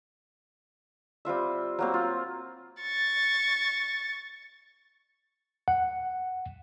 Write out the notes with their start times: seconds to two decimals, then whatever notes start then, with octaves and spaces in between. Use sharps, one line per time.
1.25 G3 C4 F4 E5
1.79 F#3 A#3 C4
1.94 F4
2.82 C#6 A6
5.68 F#5